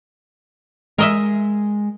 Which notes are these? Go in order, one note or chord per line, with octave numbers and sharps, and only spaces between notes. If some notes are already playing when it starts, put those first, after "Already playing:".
G#3 A#4 D#5 E5